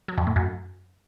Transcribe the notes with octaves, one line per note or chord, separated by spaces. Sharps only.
F#3
F2
A2
F#2